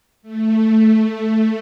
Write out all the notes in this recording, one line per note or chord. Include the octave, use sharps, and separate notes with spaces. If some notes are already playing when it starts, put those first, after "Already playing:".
A3